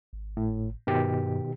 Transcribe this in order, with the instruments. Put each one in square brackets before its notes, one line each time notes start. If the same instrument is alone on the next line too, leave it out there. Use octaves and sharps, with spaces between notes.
[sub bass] G#1
[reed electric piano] A2
[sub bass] G2 [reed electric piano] B2 D#3 G4